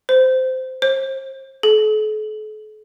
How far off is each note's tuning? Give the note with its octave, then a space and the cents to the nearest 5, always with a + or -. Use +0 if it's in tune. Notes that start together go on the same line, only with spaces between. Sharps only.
C5 -15
C5 +35
A4 -45